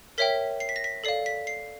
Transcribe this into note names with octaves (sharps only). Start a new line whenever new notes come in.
A#4 C#5 E5 G5 B6
C7
B6
A#6
B6
A4 D5 F5 C7
B6
C7